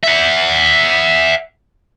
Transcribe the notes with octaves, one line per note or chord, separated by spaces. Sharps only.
E5 F#5